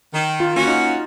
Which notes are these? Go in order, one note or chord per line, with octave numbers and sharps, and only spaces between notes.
D#3
F4
A#3 C#4 F#4
D#4